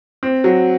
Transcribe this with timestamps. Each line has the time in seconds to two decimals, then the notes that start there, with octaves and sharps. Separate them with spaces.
0.23 C4
0.44 F#3